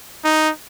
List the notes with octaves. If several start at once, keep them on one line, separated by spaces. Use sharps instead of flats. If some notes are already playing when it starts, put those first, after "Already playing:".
D#4